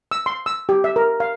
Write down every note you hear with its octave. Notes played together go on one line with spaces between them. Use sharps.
E6
C6
E6
G4
E5
A#4
F5